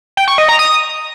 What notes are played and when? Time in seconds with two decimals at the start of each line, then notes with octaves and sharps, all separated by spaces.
0.17 G5
0.28 C#6
0.38 D#5
0.49 A#5
0.59 D#6